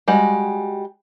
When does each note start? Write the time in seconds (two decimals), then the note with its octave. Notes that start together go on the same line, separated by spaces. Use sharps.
0.08 G3 G#3 F#4